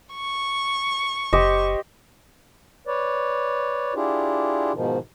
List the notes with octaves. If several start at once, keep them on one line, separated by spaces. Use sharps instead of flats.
C#6
F#1 G4 C5 D#5
B4 C#5 D5
D4 E4 F4 G4 G#4
G#2 B2 D#3 F3